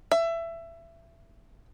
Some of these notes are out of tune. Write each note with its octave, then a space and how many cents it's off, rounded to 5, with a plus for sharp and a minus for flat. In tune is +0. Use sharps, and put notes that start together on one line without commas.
E5 +20